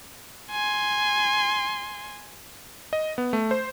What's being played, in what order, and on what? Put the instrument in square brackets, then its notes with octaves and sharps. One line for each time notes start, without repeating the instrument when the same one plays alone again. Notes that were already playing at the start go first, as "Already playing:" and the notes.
[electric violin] G#5 C6
[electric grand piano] D#5
B3
A3
C5